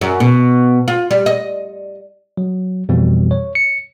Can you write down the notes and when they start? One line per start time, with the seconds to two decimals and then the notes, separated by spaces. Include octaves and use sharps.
0.01 F#2
0.20 B2
0.88 F4
1.11 G3
1.26 D#5
2.37 F#3
2.89 F2 B2 E3 G3 C4
3.31 C#5
3.55 C#7